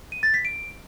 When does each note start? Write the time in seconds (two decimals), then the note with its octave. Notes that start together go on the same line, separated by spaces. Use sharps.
0.12 D#7
0.23 A6
0.34 B6
0.45 D7